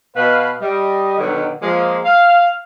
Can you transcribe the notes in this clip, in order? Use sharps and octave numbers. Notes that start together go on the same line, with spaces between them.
B2 B4 F5
G3 D#5
B2 D3 D#3 F#3
F3 G#3 A#3
F5